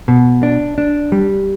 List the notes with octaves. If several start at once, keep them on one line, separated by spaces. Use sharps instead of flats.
B2
D4
D4
G3